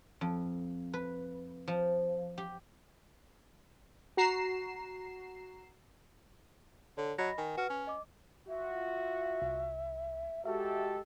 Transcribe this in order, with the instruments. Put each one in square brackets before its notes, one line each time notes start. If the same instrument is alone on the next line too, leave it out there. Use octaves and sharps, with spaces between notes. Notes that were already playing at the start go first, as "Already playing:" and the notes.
[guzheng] F2
B4
F3
G4
[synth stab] F#4 A#5 C7 E7
[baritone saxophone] D3 [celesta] C#5
[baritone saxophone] F#3 [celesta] D#5 B5 A#6
[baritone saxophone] D#3 [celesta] G#5
[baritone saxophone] F#4 [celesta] B4 F6
[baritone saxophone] C#4
[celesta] D#5 D6
[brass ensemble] F4 F#4 [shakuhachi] E5
[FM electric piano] C2
[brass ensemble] G#3 G4 A4 [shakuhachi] F#4 [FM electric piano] E5